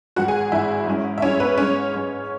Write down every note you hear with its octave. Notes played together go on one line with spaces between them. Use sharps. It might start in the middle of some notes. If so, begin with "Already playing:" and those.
G#1 G#2 E3 F#4 F#5
G#4 G#5
G#1 G#2 E3 E4 E5
G#2 G#3 C#4 E4
E5
G#2 G#3 C#4 E4 C#5
B3 B4
G#2 G#3 C#4 C#5
G#2 G#3 C#4